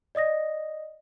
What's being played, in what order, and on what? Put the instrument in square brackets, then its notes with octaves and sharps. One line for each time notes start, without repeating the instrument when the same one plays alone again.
[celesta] D5 D#5 D#6 A#6